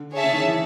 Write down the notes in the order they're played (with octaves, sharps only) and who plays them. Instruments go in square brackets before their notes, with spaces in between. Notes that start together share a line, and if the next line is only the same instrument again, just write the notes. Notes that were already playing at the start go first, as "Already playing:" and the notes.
Already playing: [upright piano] D3
[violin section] G#4 C#5 E5 A5
[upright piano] C#3
D#3
E3